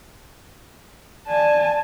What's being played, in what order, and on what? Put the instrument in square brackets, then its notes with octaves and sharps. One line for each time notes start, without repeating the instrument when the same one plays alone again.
[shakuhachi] D5 [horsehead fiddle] G#5 A5